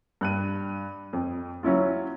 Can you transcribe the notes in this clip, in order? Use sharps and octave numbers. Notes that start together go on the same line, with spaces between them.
G2 F#6 D#7
F2
F#3 C#4 E4 F4